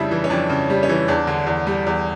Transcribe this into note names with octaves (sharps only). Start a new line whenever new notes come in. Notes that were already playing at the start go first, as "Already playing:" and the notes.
Already playing: F2 C#3 G3 D4 E4
E3
C#4
F2 D4
C#3
G3
C#4
E3
E2 D4
D3
E2
G3
E2